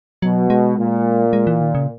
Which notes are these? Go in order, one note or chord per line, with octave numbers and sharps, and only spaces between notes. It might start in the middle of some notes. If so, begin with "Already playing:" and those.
B2 F#3
G#3
A#2
G#3
E3
D#3
C#3